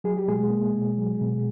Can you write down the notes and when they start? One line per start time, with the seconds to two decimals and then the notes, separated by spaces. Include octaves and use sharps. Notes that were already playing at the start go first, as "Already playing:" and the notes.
0.04 F#3 G#4
0.17 G4
0.28 B2 G#3 G#4
0.50 A#3
0.73 B2
0.98 F#3
1.21 B2